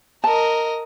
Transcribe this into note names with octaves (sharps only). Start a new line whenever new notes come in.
A#4 D#5 A5